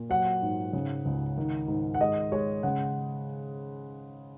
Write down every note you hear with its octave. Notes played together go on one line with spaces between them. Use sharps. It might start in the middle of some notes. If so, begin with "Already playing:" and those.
Already playing: A#2
F#3 F#5
G#2
C#3
C#2
D#3
G#2
F#5
G#3 D#5
G#3 C#5
C#3 F#5